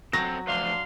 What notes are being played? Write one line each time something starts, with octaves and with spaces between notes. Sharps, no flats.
F#3 C4 A4 C5 A#6
F3 A3 D4 B4 F5 C6